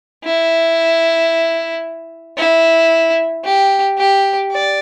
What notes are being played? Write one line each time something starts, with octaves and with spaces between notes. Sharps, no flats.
E4
E4
G4
G4
D5